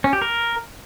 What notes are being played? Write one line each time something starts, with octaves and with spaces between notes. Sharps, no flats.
C#4
G4
A#4